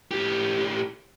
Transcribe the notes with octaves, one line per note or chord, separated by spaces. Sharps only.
A2 G4